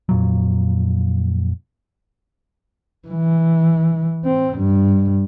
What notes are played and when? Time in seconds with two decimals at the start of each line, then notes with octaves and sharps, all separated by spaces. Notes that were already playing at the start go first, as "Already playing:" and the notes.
0.09 F2 A#2 F#3
3.08 E3
4.25 C4
4.58 G2